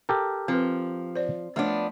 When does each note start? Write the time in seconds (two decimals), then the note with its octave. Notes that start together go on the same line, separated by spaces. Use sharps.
0.09 G4 A4 A#4
0.48 F3 C4 B4
1.15 C5 D5
1.56 F3 A3 B3 D4 C#5